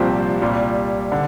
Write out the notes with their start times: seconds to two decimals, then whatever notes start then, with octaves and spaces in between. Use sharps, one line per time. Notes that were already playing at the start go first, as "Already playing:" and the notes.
Already playing: C2 A#2 F3 C4 G4
0.42 C2 A#2 G3
1.12 D3